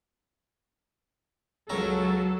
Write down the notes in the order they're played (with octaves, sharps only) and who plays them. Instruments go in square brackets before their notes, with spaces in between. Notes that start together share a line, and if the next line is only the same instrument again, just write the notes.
[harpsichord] C#2 C#4 A#4 [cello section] F#3 [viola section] A4